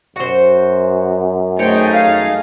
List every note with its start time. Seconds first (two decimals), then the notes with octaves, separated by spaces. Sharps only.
0.16 F#2 F#4 C5
1.59 A3 D#4 G#4 C5 C#5 G5
1.93 F5